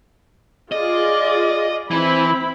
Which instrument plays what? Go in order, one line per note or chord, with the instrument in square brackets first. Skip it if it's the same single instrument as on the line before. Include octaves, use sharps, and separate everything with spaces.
[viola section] F4 G#4 D5 [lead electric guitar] D#5
[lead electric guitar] E3 [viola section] C4 E4 B5